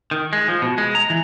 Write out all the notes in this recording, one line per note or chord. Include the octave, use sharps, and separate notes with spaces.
D#3
G#3
F3
B2
G#3
A#5
E3